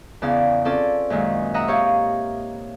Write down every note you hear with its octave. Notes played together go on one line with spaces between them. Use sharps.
E2 C#3 D5 F5
C4 C#4 F4 A4 D5
F#2 A#2 D#3 G#3
D#5 E5 F#5 A#5
G4 C#5 F5 C#6